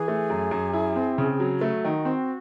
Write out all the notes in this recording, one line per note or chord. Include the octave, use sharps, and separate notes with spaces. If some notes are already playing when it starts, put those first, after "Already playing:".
Already playing: E3 G#4
A3
F#2
F#2
E4
C4
C#3
F#3
E4
A3 F#4
D#3
C4